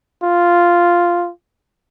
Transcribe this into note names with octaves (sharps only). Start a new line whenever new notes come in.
F4